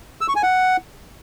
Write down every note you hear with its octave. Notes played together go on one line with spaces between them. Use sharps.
E6
C#6
G#5
F#5